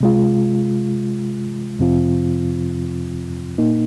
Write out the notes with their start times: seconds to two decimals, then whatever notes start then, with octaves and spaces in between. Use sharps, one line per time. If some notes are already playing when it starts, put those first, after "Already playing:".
0.01 C3 G#3 F4
1.79 F2 C3 F3 C4 F4
3.58 A#2 A#3 D#4